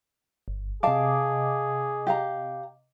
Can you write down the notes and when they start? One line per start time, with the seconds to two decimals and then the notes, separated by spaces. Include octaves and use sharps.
0.48 G1
0.83 C3 G#4 D#5 F5 A5 D6
2.07 G4 F5 A#5